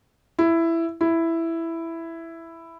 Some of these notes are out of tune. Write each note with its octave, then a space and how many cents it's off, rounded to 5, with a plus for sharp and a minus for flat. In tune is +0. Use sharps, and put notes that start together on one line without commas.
E4 +10
E4 +5